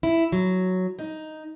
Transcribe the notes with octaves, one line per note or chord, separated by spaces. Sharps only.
E4
F#3
D#4